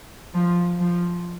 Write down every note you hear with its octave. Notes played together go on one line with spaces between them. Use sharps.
F3
F3